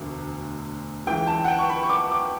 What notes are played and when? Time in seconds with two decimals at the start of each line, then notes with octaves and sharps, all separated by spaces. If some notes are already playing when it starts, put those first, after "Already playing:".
Already playing: E1 D2 D3
1.06 C#2 C#3 E3 G5
1.27 A5
1.44 F#5
1.48 G5
1.58 C#6
1.69 B5
1.83 C#6
1.89 D6
2.11 D6